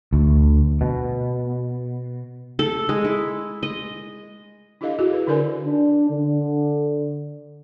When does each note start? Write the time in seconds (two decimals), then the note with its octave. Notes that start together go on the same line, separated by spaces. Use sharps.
0.13 D2
0.81 B2
2.59 A4
2.89 G#3
3.04 E4
3.63 D#5
4.81 D4 E4 G4 A4 D#5 F5
4.99 E4 F#4 G#4
5.13 B4
5.27 D3 D4 A4 A#4 D5 G#5
5.66 D4
6.10 D3